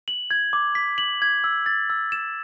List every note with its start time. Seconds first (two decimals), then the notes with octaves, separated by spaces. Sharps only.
0.08 F#7
0.31 G#6
0.53 D6
0.75 B6
0.98 F#7
1.22 G#6
1.44 E6
1.66 A6
1.90 E6
2.12 E7